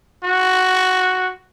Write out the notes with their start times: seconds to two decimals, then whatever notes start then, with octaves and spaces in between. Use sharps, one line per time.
0.24 F#4